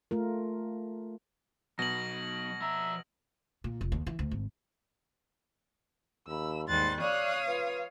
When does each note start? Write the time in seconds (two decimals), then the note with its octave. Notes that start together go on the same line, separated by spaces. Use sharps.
0.11 A3 F4 A#4
1.79 B2 F#3 B3 A#6 F#7
2.61 F3 E5 A#5
3.64 A#2
3.81 F1
3.92 D#2
4.06 E3
4.19 D2
4.31 G#1
6.27 D#2 B5 E6
6.67 D#2 G#2 G3 C6 F#6 A6
7.00 C#5 D5 F5 C#6 D#6 F#6
7.47 F4 B4